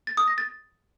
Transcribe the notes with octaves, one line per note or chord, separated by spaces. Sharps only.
A6
D#6
A#6
A6